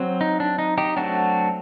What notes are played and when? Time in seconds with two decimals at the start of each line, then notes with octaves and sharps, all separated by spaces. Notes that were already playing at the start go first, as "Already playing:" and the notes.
Already playing: F#3 C4
0.21 D#4
0.40 D4
0.59 D#4
0.78 D#4 G4
0.96 F#3 A3 C4 D4 F#4